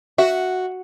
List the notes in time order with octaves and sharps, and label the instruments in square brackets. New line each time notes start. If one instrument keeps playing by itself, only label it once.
[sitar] F#4 [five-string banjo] E5